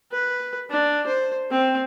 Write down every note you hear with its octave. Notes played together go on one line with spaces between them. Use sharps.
B4
D4
C5
C4